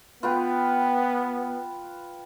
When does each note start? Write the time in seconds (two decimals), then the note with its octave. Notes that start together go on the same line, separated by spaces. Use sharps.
0.23 B3 F4 B4 G5